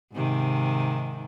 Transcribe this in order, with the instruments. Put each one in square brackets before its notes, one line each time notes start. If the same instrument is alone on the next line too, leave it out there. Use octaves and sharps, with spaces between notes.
[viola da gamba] G#2 C3 D#3